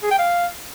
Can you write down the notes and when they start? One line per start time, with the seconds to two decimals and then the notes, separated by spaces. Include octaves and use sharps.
0.03 G#4
0.11 G5
0.19 F5